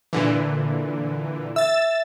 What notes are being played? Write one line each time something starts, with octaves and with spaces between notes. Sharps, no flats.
A#2 D3 E3
E5 E6 A6